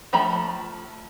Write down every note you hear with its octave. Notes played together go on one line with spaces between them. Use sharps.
F3 A3 A#5 B5